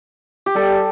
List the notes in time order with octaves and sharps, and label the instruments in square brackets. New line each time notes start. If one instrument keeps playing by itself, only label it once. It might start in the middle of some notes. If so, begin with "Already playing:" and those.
[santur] G4
[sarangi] G3 [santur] A4